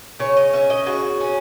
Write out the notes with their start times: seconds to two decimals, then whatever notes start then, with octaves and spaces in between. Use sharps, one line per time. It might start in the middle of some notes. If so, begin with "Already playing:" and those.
0.19 C#3 C#5
0.37 D#5
0.53 C#4 E5
0.70 D#5
0.86 C#3 F#4
1.21 C#4